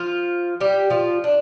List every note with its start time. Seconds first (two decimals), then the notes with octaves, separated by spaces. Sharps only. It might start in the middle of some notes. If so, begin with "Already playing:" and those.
Already playing: F3 F4
0.61 G3 G4
0.90 F3 F4
1.24 D4